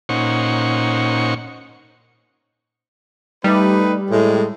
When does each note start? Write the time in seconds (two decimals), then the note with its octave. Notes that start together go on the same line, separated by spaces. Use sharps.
0.09 A#2 C#4 D#4 C5 F#5 C#6
3.44 G3 A3 D#4 B4
4.11 A2 G#3